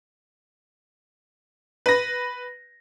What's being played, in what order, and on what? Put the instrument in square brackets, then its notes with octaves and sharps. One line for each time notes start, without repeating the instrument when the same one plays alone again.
[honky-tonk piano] B4 A#6